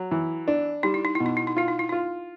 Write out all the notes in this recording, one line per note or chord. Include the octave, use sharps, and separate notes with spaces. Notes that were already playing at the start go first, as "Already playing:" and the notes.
Already playing: F#3
E3
D4
G3 D#4
E4
D#4
B2 E4
D#4
E4
D#4
E4 F4
D#4
E4
D#4 F4